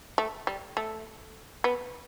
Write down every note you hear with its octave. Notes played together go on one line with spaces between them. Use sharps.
A3
G3
A3
B3